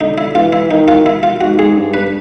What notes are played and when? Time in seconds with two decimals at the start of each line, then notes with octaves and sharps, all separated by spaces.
0.01 D3 D#4
0.18 E4
0.35 E3 F4
0.53 E4
0.71 D#3 D#4
0.88 F4
1.06 E4
1.23 F4
1.41 G#2 F#4
1.59 G#4
1.76 G2
1.94 B4